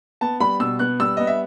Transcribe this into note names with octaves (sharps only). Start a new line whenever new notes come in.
B3 A5
G3 B5
B2 E6
B3 F#6
G3 E6
B3 D#5
E5